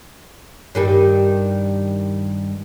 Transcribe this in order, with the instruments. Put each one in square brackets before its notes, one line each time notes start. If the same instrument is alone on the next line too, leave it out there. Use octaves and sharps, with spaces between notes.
[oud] G2 D#3 G3